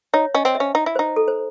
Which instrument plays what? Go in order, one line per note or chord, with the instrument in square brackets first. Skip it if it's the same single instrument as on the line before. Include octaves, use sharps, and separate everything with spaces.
[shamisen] D#4 [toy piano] C#5
[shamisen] C#4 [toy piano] D#5
[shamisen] C4
[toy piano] E5
[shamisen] C#4
D#4
E4
[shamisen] D#4 [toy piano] C5
[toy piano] A4
C5